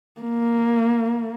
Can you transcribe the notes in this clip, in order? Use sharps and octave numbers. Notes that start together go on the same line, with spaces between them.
A#3